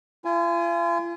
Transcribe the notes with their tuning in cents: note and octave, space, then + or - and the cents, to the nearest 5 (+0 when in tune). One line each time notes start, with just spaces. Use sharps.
F4 -40 G#5 +0